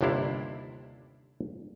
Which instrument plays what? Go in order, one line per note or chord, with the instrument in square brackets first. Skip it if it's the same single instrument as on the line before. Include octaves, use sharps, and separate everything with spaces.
[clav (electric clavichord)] G1 D#2 C3 D4 E4 F5